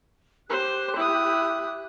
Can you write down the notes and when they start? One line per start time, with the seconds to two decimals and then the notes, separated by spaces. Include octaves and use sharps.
0.50 G4 C5 F#6
0.96 E4 D#6